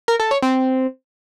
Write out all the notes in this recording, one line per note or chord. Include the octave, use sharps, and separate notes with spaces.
A#4
A4
C#5
C4